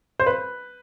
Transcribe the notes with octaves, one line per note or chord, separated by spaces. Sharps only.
C5
B4